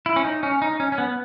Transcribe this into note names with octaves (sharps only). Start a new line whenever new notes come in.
E4
C#4
D#4
C#4
D#4
C#4
C#4
B3